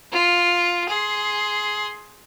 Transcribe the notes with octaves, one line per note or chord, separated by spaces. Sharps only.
F4
G#4 C6